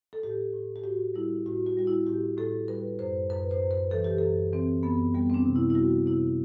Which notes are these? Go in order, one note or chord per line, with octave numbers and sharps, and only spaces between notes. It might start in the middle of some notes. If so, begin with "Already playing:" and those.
A4
A2 G4
A2
G4
A2 F#4
G3 E4
A2 F#4
F#4
G3 F#4
E4
A2 G4
A2 A4
G3 B4
F#2 C5
F#2 B4
C5
F#2
B4
E3 A4
G4
F#2 A4
E3 C4
F#2 B3
G3 B3
C4
D4
C3
E4
E4
G3 F#4
C3 E4